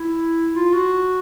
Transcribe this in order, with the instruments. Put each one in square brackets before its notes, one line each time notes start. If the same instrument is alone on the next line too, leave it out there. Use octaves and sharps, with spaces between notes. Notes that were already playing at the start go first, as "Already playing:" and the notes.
Already playing: [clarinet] E4
F4
F#4